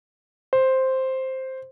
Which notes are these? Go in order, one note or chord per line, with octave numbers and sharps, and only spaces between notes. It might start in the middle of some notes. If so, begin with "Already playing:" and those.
C5